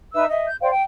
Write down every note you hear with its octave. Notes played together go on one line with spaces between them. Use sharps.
D#4 B4 E5 E6
D#5 E5
G6
C5 D5 F5 G5
G5